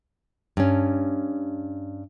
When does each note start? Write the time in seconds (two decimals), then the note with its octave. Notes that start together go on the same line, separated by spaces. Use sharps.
0.57 G2 C#4